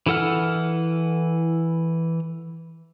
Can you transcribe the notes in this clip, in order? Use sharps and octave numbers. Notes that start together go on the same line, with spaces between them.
E3 E4 A4 F#5 F6